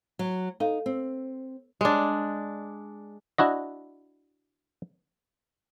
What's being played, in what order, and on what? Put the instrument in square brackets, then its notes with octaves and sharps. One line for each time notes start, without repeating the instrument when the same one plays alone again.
[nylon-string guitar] F#3
[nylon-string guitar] D#4 [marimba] A4 F5
[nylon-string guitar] C4
[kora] G#3 D4
[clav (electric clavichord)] D4 E4 F#4 D#5